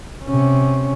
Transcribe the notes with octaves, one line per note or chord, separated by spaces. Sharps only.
C3 C#4